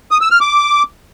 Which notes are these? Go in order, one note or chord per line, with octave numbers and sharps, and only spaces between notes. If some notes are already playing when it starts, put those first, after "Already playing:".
D#6
E6
F6
D6